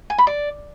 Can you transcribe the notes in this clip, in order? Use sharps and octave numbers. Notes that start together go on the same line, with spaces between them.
G#5
B5
D5